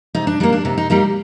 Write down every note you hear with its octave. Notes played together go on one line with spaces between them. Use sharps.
C3 D#4
D4
G3 A#3 D#4
D4
C3 D#4
D#4
G3 A#3 D#4